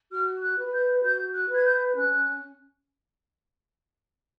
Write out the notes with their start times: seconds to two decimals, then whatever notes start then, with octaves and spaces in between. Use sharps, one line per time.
0.12 F#4 F6
0.42 F#6
0.58 B4
0.73 G6
1.03 F#4 G6
1.34 F#6
1.49 B4 G#6
1.64 G6
1.94 C#4 F#6